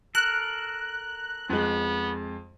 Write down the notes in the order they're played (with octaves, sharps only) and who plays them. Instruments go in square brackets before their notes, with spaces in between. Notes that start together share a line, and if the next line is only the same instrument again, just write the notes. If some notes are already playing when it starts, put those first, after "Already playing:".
[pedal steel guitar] A4 A#4 [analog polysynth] F#6
[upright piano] F2 G#3 [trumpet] B3